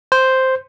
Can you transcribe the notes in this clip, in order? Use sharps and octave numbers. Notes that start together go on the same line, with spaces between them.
C5